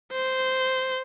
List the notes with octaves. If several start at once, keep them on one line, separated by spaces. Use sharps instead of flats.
C5